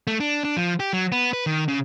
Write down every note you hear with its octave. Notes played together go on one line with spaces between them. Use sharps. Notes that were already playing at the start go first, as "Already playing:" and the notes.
A3
D4
D4
F3
G4
F#3
B3
B4
D#3
C#3